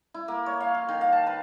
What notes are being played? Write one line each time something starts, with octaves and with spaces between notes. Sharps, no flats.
E4
A#3
C#5
F5
F3
D#3
F5
A5
B4